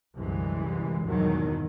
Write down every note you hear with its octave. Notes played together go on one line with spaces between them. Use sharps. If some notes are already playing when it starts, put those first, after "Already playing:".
C2 F#2 D3 E3 G#3
G#1 E2 G2 B2 D#3 F#3